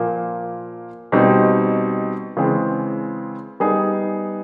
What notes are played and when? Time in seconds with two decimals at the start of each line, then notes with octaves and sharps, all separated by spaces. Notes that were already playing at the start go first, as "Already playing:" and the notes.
Already playing: A#2 F3 A#3
1.12 B2 G3 C4 D#4
2.37 C#3 E3 G#3 C4
3.60 G3 B3 D#4 G#4